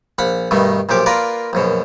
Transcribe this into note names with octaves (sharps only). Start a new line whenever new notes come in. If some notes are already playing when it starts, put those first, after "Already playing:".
A#1 F5 F#5 B5
G2 B2 D#3 A3
B1 A#2 F3 G4 D6
A#3 F4 A#4 B4 D5
A#1 F#2 B2